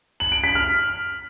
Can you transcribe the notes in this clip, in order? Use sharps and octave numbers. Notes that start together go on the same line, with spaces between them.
F#7
D7
B6
F6